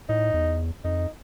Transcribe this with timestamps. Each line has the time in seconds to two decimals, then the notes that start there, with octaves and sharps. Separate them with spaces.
0.09 A2 D#4
0.34 E2
0.84 F2 D#4